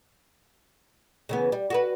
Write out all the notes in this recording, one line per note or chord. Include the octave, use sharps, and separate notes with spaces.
C#3 E3 B3
G3
F#4 G#4 B4